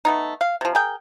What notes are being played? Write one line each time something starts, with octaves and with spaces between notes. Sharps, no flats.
A3 B3 D#4
F5
C3 F3
G#4 A#4 G5